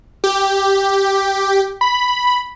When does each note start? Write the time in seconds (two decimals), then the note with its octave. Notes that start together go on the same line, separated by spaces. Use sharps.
0.24 G4
1.81 B5